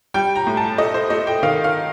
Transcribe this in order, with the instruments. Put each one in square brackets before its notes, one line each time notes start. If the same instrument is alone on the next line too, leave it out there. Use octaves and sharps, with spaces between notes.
[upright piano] G3 G5
A#5
A2
A5
A3 D#5
C5
A3 D#5
G5
D#3 F5
F5